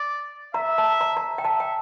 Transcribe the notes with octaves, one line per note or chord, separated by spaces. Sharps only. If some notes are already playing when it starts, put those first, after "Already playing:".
Already playing: D5
E5 A#5
A5
A#5
A#5
G5
E5 A5
G5